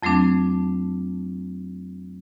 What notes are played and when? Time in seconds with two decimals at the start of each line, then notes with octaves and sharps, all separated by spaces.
0.03 F2 F#3 A3 C4 D4